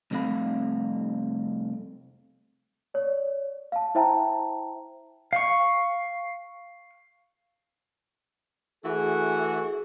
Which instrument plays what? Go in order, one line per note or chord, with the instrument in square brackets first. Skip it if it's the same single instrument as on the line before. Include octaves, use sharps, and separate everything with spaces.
[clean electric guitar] C2 F2 A3 C4 F5 B5
[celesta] C#5 D5
F5 A5
E4 C5 E5 G5 A5 A#5
[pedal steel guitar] F5 C#6
[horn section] E3 A3 F#4 [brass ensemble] G#4